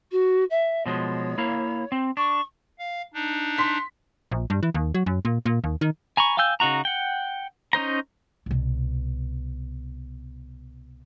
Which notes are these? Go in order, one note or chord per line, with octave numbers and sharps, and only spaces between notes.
F#4
E5
B2 F3 G#3 C#5
A#3 E4 F5
C4
D4 C#6
F5
D4 D#4
C6 B6
A#1
G2
E3
D#2
F#3
F#2
A#2
A#2
D#2
D#3
G#5 A#5 B5 C#6
F5 G5 G#5 E6 G6
C#3 D#4 F#4 A#5
F#5 G5
C#4 D#4 C5 A#5
C2 B2